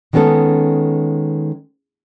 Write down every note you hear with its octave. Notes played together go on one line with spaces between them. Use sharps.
D#3 G#3 B3 C#4 A4